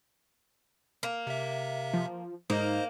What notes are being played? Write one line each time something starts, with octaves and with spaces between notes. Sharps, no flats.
A#3
C3 E5
F3
G#2 A#3 D#4 C5 D#5